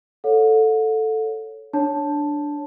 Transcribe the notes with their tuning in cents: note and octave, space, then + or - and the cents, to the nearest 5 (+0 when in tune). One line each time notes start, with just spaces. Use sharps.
A4 +0 C#5 +0 F#5 -40
D4 +0 C#5 +0 A5 +0